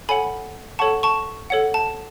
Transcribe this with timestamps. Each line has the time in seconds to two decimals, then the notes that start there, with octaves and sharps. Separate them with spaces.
0.09 A4 C#5 F#5 G#5 B5
0.79 A4 C#5 F#5 A5 C#6
1.03 A5 C#6
1.50 A4 C#5 F#5
1.74 A5